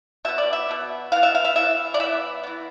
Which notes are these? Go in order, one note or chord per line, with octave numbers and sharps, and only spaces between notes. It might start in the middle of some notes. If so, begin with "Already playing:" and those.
B2 B3 E5
D5
E5
B2 B3
E3 B3 F5
E5
F5
E5
E3 B3 E5
D5
E3 B3 E5
E3 B3